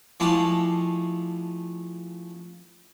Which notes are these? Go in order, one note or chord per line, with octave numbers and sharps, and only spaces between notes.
F3 G#3 A3 E4 G4 F5